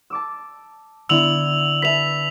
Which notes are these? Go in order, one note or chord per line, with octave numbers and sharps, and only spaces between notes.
A5 D6 E6
D3 B3 E4 E6 F7 F#7
B4 E5 A5 B6 F7